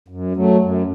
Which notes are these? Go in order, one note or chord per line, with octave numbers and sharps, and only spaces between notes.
F#2
F#3 A3
F#2